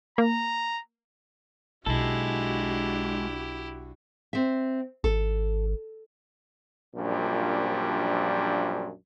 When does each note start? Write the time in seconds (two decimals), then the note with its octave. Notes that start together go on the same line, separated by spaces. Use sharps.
0.18 A#3 A#5
1.86 B1 G#3 D4 E4 F#4 G4 A4
4.33 C4 E5
5.04 G#1 A4
6.96 A#1 F#2 A#2 F3 G3 D4